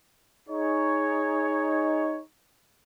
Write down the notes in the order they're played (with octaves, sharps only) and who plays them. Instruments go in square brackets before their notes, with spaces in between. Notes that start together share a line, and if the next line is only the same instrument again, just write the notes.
[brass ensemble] D#4 G#4 C#5